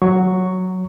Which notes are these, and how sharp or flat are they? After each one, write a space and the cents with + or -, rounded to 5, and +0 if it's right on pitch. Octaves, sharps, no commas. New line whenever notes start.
F#3 +0 C#6 +5